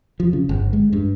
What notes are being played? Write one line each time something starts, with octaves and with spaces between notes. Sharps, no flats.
F3
C#3
G1
G#3
G2